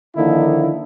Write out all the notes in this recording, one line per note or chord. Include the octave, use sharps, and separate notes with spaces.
D3 D#3 F3 A#3 D#4 E4